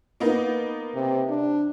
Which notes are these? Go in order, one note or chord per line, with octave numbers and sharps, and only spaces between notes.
A#3 B3 D#4
C3
D4